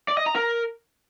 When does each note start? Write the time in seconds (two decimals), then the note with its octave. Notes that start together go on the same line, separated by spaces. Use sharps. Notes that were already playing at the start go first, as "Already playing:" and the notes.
0.08 D5
0.17 D#5
0.26 A#5
0.35 A#4